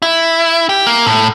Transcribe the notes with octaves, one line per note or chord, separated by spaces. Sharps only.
E4
G4
A#3
A2